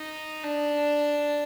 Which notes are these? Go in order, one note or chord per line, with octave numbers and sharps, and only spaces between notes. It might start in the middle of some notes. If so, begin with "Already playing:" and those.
Already playing: D#4
D4